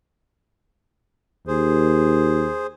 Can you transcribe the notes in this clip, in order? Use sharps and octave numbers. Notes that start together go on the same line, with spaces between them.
D#2 G#4 C5